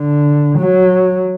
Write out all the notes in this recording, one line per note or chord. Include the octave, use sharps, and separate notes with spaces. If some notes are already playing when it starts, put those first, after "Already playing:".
Already playing: D3
F#3